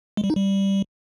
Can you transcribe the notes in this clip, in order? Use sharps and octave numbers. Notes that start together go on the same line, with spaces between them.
G#3
G3
D#4
G3